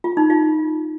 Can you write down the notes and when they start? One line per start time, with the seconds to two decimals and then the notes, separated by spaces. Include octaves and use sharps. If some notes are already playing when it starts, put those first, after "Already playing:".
0.04 F4
0.17 D#4
0.30 F4